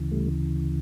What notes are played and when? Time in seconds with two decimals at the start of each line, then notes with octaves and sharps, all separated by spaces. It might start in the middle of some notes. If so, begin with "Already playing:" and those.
Already playing: D2 C#3 E3
0.11 G3 A3